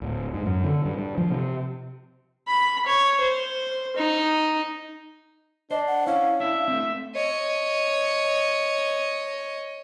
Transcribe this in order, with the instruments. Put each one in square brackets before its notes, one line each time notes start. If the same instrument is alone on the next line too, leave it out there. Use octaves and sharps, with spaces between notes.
[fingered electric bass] D1
G#2
F#2
D3
G2
G2
F3
C3
[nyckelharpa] B5
C#5
C5
D#4
[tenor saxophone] D4 [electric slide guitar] C5 [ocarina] D#5
[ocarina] F#5
[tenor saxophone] C#4 [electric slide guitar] E4 [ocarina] F5
[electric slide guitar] D4 E4 [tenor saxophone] E5
[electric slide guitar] A3 C4
[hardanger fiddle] C#5 D#5